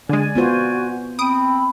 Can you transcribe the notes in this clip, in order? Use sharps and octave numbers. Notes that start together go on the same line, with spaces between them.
D3 G#3 D5 G#5
B3 F4 F#4 C5
C4 B5 D#6 D7